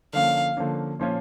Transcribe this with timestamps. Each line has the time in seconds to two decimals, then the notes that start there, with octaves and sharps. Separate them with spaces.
0.13 D3 F3 A#3 C#4 F5
0.57 D3 F3 A#3 C#4
0.99 A#2 F3 C#4 F4 C#5